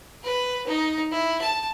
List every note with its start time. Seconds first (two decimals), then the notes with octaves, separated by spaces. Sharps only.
0.24 B4
0.67 D#4
1.12 E4
1.42 A5